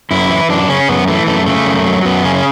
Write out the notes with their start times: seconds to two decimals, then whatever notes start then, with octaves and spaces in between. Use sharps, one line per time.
0.11 F#2 E4
0.29 E3
0.49 F#2 D4
0.68 C#3 C#4
0.88 F#2 B3
1.08 E3 A3
1.27 F#2 A3
1.46 C#3 A3
1.66 F#2
1.86 F#3
2.05 F#2 B3
2.24 C#3 C#4
2.35 C#4